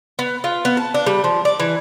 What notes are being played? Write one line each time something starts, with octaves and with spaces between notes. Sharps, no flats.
B3
F4
B3
A5
D4
G3
F3
D5
E3